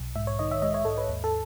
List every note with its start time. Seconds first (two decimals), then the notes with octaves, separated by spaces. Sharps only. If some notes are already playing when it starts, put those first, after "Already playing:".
Already playing: B1
0.16 G#2 E5
0.27 C#5
0.39 D#3 D#5
0.51 E5
0.62 G#3 D#5
0.74 C#5
0.85 G#2 A4
0.98 B4
1.09 D#2
1.24 A4